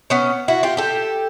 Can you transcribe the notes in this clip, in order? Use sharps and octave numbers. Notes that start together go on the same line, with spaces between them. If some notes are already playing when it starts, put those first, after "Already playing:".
B3 C#4
E4 F#4
F4 G4
G4 A4